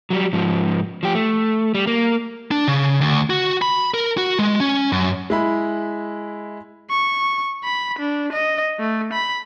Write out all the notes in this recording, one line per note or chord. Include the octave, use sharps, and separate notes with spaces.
F#3 G3
G#2 F3
F3 G4
A3
G3
A#3
D4
C#3
D2
F#4
B5
A#4
F#4
G#3
C#4
F#2
G#3 E4 B5
C#6
B5
D4
D#5
A3
B5